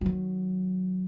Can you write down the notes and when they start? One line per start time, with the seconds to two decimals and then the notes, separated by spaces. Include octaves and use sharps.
0.01 D#3 F#3